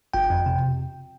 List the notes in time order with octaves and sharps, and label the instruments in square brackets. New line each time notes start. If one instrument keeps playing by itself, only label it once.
[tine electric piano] G1 G5
F2
C3